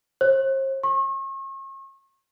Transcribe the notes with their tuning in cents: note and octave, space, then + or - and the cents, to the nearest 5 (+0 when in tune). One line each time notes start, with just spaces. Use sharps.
C5 +40
C#6 -40